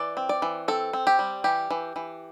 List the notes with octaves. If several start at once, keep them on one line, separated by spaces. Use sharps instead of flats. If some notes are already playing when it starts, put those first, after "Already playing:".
Already playing: E3 D5
C4
D5
E3
C4 A4
C4
G4
G3
E3 G4
E3
E3